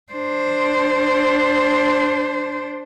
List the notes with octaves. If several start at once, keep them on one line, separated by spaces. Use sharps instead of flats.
D4 C5